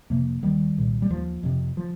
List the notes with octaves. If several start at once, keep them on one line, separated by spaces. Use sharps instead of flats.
F2 C3 F3 A#3
D#2 D#3 G3
C2 A#2
G3
D#2 F3
F2 C3
F3